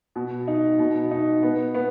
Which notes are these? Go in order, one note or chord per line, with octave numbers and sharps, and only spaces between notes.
B2
D#4
B2
D#4
B3
B3